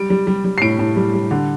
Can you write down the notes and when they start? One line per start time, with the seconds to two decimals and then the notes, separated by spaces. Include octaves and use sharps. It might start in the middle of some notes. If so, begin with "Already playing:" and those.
Already playing: G3 D7
0.10 G3
0.27 G3
0.45 G3
0.58 C7
0.62 A2 D7
0.79 A2
0.96 G3
1.14 G3
1.31 D3